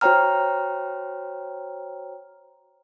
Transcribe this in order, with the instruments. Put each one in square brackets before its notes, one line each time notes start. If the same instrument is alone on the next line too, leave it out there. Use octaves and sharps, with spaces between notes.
[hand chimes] F#4 C5 C#5 G5 A#5 F6